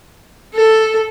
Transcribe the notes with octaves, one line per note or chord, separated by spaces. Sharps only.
A4